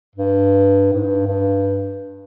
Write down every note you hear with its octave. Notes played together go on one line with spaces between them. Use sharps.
G2
G#2
G2
G2